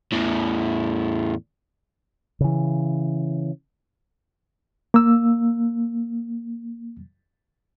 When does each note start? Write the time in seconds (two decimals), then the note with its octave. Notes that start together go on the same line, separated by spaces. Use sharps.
0.12 E2 A2
2.40 C#3 E3
4.94 A#3 E6